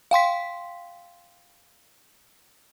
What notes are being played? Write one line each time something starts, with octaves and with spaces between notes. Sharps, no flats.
F5 G5 C6 B6